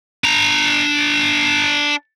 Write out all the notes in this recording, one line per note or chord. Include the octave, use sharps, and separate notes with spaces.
D4 A#5